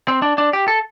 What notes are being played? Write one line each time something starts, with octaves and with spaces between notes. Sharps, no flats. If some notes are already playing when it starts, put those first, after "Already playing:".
C4
D4
D4
G4
A4